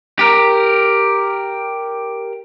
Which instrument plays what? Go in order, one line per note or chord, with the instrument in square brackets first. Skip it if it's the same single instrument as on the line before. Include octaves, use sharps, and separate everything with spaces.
[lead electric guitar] G4 A#4